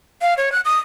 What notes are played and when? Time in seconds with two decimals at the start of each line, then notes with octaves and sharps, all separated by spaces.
0.22 F5
0.38 C#5
0.52 F#6
0.65 D#6